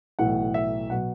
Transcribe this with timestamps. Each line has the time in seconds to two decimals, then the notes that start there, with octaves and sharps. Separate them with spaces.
0.19 B1 A2 E3 F#5
0.54 E5
0.90 B2 F#3 F#5